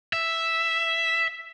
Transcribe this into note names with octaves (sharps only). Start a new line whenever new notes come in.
E5